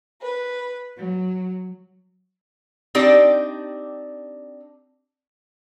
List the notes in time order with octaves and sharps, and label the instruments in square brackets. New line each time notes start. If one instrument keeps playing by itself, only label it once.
[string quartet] B4
F#3
[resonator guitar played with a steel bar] C4 D4 D#4 G4 D5